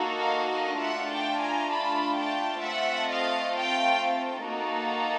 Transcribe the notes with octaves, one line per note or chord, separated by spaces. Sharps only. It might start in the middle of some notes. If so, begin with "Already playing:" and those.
Already playing: A#3 D#4 F#4 A4
D#5 F5
D#5 F5
A3 D4 F4 E5 F#5
G5 A5
G#5 A#5
A5 B5
G5 A5
A3 C4 F4 A4 E5 F#5
D#5 F5
F5 G5
A#3 D#4 F#4 A4